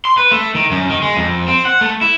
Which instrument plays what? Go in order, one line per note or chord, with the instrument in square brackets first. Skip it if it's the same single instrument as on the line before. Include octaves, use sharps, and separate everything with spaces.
[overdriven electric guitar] C6
B4
A3
D#3
F#2
D#3
G#3
F2
C4
F#5
A3
E4